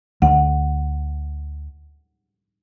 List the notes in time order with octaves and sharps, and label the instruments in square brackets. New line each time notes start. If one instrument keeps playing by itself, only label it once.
[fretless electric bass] D2 [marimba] F#5